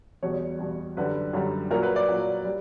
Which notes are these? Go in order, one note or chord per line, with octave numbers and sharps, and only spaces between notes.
E2 B2 G3 C#5
E2 B2 G3
F#2 D3 G3 B4
F#2 D3 G3
A#2 F#3 A#4
B4
D5
A#2 F#3
G3